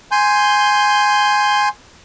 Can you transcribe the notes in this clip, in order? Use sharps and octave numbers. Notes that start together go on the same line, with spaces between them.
G#5 C6 G6